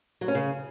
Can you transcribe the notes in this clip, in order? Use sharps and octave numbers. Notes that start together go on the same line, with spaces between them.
F#3
C#4
C#3